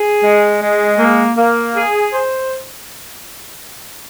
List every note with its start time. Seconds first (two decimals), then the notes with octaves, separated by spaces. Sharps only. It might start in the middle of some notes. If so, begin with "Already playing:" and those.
Already playing: G#4
0.23 G#3
0.61 G#3
0.98 A#3
1.37 A#3
1.75 G#4
2.12 C5